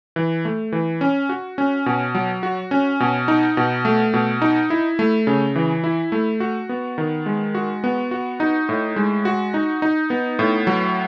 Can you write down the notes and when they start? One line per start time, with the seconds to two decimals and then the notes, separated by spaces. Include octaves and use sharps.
0.16 E3
0.45 A3
0.72 E3
1.01 C#4
1.29 F#4
1.58 C#4
1.86 B2
2.15 F#3
2.43 F#4
2.71 C#4
3.00 B2
3.28 D#4
3.57 B2
3.85 A3
4.14 B2
4.42 D#4
4.70 E4
4.99 A3
5.27 C#3
5.56 E3
5.84 E4
6.12 A3
6.40 F#4
6.69 B3
6.98 D#3
7.26 G#3
7.55 F#4
7.84 B3
8.11 F#4
8.40 D#4
8.69 A2
8.96 G#3
9.25 F#4
9.54 D#4
9.82 D#4
10.10 B3
10.39 A2
10.67 F#3